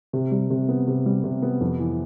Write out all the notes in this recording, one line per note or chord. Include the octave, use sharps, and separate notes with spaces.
C3
G3
C3
B3
C3
G3
C3
B3
F2
E3